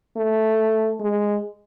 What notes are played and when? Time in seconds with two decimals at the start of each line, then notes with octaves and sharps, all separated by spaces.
0.16 A3
1.00 G#3